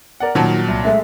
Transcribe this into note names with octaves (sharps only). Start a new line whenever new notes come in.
A#4 D5 F#5
A#2 D#3 F3 F#3 F#4 A5
C2
G#3 A3 E5